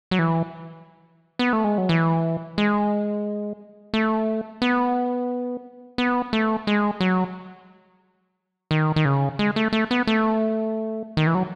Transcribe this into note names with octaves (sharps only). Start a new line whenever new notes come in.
F#3
E3
B3
A3
G#3
F#3
E3
G#3
A3
B3
B3
A3
G#3
F#3
D#3
D#3
C#3
G#3
A3
A3
B3
A3
D#3
E3
F#3